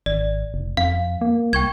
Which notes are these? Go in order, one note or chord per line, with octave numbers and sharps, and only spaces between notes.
G#1 D5
F1
F2 F5
A#3
C2 G5 C#6 G#6